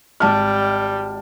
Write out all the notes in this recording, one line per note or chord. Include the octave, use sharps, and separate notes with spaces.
G#1 G3 A5 F6